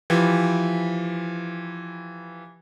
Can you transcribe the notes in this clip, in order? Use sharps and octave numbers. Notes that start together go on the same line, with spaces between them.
E3 F3 G4